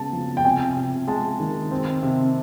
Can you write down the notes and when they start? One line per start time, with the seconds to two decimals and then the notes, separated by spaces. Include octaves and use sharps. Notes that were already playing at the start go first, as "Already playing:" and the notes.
Already playing: C#3 G#3 B3 A5
0.13 F3
0.37 G5
0.45 C3 G#5
0.76 C3
1.07 G#3 A5
1.40 D#3
1.71 C4
2.03 C3